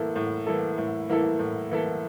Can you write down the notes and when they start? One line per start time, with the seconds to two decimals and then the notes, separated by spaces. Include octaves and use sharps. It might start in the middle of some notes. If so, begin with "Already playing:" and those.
Already playing: A2 E3 A#3 E4 A4
0.16 A2
0.46 E3 A#3 E4 A4
0.78 A2
1.09 E3 A#3 E4 A4
1.39 A2
1.71 E3 A#3 E4 A4